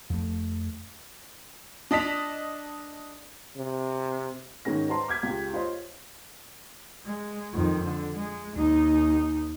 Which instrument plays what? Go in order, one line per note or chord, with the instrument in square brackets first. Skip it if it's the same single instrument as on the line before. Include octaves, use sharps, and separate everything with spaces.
[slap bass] F2 A3
[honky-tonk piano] D4 D#5 A5 B6 F7
[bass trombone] C3
[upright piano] G#2 D#3 C#4 A#6
B4 C5 D#5 A5 A#5 C6
D6 G6 G#6 B6
C#2 G4
F4 C5 C#5 D#5
[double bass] G#3
F2 D#3
D3
G#3
D#2 D#4